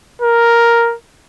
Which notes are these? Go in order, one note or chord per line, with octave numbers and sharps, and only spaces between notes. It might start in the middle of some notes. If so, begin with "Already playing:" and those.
A#4